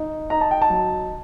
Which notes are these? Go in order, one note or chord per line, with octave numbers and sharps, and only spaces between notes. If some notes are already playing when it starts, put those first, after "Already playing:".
Already playing: D#4
D#4 A#5
A5
G5
A5
F#3